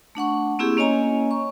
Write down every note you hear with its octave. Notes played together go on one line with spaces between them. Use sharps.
A3 D4 F#5 C#6
A#3 C4 E4 G4 G#4
A#3 C#4 C#5 D#5 G#5 A#5
C#6